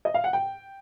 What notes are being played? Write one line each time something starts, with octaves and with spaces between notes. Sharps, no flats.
D#5
F5
F#5
G5